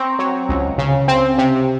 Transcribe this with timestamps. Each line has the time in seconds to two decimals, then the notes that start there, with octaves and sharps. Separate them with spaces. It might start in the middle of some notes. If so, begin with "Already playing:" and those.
Already playing: C4 A#5 C#6
0.19 F#3
0.49 C#2
0.78 C#3
1.08 C4
1.38 C3